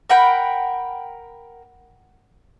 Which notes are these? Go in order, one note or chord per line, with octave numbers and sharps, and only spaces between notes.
A#4 F#5 G5 B5